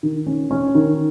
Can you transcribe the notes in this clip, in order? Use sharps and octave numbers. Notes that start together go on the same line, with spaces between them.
D#3
C#4
C#4
D#3